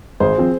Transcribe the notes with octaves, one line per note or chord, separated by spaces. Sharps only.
G#1 G#4 C5
F3 C4